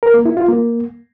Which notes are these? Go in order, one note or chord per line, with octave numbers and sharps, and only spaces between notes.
A#4
A#3
E4
F4
A#3